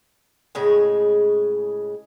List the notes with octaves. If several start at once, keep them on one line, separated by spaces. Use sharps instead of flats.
A2 C#3 G#3 G#4